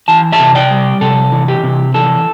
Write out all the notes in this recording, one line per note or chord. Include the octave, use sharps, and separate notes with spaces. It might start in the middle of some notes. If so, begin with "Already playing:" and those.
E3 A5
E5 A5
C3
D5 G5
G3
C3 A4
E3
G4
C3
E3 A4